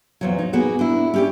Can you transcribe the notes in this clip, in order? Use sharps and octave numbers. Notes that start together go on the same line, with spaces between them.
E2 F3 F#3
D#4
A#3 B3 F#4 G#4
D4 E4
C#4 G4 D5